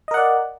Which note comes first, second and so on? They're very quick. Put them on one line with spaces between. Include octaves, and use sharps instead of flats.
D#5 A#4 F#5 D5